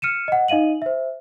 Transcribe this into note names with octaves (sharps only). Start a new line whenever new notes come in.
F6 C#7 D#7 E7
D#5 F#5
D#4 D#5 F5 D#7 F#7
C5 E5